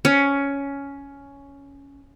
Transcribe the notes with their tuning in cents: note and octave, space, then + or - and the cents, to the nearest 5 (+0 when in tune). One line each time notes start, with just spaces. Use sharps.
C#4 +10